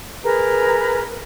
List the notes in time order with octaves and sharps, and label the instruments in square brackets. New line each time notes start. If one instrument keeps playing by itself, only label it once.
[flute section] G#4 A#4 B4 A#5